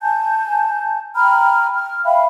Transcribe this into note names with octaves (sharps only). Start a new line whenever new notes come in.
G#5 A5 G6
G5 A#5 B5 F6
F6
E5 F5 G5 B5